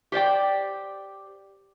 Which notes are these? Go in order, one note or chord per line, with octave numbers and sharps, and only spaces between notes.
G4 C5 D5 G5